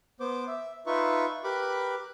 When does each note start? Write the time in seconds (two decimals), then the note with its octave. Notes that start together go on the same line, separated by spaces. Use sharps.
0.20 B3 C5 D6
0.48 E5
0.86 D#4 F4 B4 E5 C#6
1.44 G4 A#4 B4 B5 D6 F#6